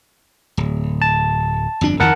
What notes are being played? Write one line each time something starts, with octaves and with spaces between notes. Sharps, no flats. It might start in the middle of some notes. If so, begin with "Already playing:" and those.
D1
A5
G1 F2 D4
F2 D#3 A#4 F#5 A5